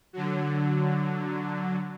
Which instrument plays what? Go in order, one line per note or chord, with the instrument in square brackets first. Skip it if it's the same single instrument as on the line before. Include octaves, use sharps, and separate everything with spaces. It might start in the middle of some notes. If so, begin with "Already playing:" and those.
[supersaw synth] D3 F#3